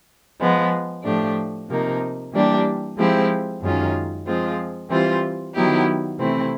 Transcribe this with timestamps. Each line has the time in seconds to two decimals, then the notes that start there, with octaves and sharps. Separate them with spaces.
0.40 F3 G#3 B3
1.04 A2 F3 A3 D4 G4
1.69 C3 F3 A#3 D#4
2.33 E3 G3 A#3 D4 G4
2.97 F3 G#3 C4 E4 G4
3.62 F#2 D#3 G#3 C#4 F4
4.26 F3 G#3 C4 F4
4.89 E3 G3 C4 F4
5.54 D#3 F#3 B3 E4 G4
6.18 C3 E3 A3 C4 E4